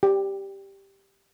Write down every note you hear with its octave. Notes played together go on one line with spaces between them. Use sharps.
G4